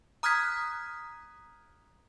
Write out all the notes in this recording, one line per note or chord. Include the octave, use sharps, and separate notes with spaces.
A#5 D#6 F6 F#6 G#6 B6